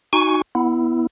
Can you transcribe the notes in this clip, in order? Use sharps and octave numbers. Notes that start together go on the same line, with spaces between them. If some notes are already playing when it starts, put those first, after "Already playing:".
D#4 F#4 G#5 C#6
B3 E4